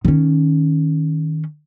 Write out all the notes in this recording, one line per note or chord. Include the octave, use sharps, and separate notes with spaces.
D#3 C#4